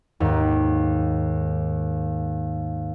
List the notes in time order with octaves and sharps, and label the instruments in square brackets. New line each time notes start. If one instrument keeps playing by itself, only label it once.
[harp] D#2 G#2